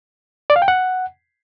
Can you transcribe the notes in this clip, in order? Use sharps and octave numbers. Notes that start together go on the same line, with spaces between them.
D5
F5
G5
F#5